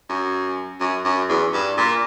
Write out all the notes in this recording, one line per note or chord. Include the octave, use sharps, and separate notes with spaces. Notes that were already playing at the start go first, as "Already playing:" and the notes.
F#2
F#2
F#2
E2
G2
A#2